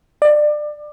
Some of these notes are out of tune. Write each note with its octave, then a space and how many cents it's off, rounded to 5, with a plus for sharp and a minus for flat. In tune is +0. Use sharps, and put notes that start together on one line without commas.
D5 +25